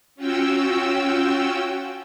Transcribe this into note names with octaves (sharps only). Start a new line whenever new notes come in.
C#4 F4 F#4 G5 E6